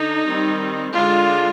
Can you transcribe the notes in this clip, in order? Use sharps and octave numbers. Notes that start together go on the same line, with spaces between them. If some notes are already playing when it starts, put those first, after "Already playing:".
Already playing: D3 D4 D#4
D#3 G3 C4
D3 G#3 D4 F4